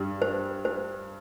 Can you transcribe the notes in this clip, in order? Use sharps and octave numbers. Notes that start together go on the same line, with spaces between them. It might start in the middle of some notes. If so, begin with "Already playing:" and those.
Already playing: G2 G3
C5
C5